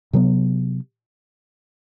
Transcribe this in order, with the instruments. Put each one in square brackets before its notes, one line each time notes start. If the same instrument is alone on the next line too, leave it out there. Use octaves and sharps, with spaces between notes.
[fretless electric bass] C3 F#3 B3